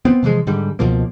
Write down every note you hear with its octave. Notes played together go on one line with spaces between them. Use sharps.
B3 C4
C3 E3 F3 G#3
G#2 D3 G3
C#2 B2 F3 A#3